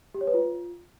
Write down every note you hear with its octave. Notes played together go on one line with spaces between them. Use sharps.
G4
C#5
B4
F4